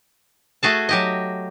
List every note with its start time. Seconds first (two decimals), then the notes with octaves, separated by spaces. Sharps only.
0.63 A3 F#4 G#4 A5
0.89 F#3 G4 D#5